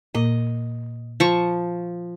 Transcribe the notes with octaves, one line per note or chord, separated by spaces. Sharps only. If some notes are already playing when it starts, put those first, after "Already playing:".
A#2 A#3 D#5
F3 C#6